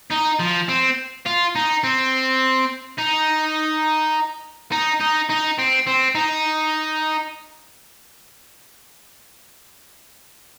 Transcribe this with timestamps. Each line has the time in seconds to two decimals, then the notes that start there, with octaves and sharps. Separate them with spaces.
0.12 D#4
0.40 F3
0.69 C4
1.26 F4
1.55 D#4
1.84 C4
2.98 D#4
4.72 D#4
5.00 D#4
5.29 D#4
5.58 C4
5.87 C4
6.15 D#4